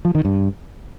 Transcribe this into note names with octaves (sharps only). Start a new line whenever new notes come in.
F3
D#3
G2